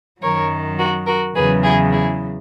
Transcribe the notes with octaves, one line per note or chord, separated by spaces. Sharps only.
F#2 D#3 F#3 A#4 C#5
F#4 A#4
F#4 A#4
E2 C#3 F#3 G#4 B4
E4 G#4
E4 G#4